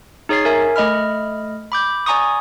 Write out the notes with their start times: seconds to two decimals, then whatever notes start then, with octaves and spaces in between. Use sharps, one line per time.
0.29 D#4 G#4 C#5 A6 C7
0.45 A#4 E5 G#5
0.76 A3 D#5 B5 F6
1.72 B5 D6 G6
2.06 D5 G#5 A#5 C#6 D#6